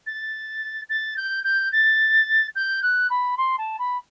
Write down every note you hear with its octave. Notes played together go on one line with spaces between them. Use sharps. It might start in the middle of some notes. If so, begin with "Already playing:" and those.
A6
A6
G6
G6
A6
G6
F#6
B5
C6
A5
B5